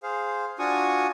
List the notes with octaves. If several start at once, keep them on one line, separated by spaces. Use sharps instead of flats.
G#4 C5 F5
D4 F4 F#4 G#5 C#6 D#6